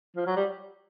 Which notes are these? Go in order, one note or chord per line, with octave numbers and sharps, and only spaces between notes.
F3
F#3
G3